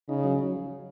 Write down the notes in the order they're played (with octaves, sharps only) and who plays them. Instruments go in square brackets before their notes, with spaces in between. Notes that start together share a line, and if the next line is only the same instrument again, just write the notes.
[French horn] C#3 [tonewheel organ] D#4
[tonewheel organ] F#3
F#3